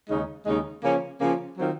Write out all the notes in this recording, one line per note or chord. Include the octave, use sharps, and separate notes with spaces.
D#2 C#3 G#3 D#4
D#2 C#3 G#3 D#4
C#3 F3 A#3 C#4
C#3 F3 A#3 C#4
D#3 F#3 C4 F4